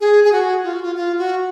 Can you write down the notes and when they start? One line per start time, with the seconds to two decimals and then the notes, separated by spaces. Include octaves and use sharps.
0.01 G#4
0.24 G#4
0.32 F#4
0.64 F4
0.74 F#4
0.83 F4
0.96 F4
1.18 F#4